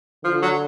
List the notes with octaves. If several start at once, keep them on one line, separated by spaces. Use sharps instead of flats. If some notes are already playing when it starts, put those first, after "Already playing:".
D3 F3
F#3